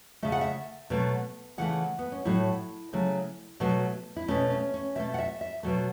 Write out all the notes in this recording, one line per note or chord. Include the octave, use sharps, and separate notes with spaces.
C#3 A3 E5
F#5
E5
B2 F#3 A3
C#3 E3 A3 F#5
B3
C#4
A2 F#3 A3 E4
C#3 F#3 A3
B2 F#3 A3
E4
B2 A3 C#4
C#4
C#4
B2 A3 E5
F#5
E5
E5
B2 F#3 A3